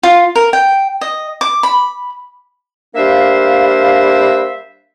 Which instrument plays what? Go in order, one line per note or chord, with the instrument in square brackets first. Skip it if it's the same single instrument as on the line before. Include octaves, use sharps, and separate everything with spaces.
[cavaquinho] F4
A#4
G5
D#5
D6
B5
[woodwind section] G3 A#3 D4 C5 E5 F5